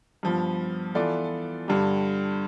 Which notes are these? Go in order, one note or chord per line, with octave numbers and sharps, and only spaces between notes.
G2 F3 B3
E3 B3 F4 A4 D5
G2 D3 G3